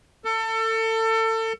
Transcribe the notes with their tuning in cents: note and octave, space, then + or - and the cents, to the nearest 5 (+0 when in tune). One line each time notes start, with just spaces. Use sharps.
A4 +30